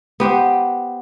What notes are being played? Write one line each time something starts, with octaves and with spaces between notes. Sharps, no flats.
B3 G4 C5